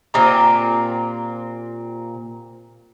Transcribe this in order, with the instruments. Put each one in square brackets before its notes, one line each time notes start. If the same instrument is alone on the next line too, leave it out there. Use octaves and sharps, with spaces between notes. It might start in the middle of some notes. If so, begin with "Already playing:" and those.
[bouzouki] A#2 C4 G4 A#5